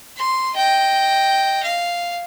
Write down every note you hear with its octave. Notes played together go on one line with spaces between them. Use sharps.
C6
D#5 G5
F5